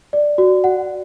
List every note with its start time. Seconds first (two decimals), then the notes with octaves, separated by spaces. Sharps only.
0.13 D5
0.38 F#4
0.64 F#5